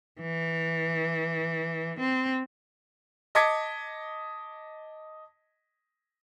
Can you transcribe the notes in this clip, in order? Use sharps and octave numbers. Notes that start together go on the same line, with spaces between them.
E3
C4
D#5 A5 D6 G#6 B6 C#7